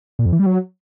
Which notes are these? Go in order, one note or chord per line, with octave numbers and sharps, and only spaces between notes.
A#2
F2
E3
G3
F#3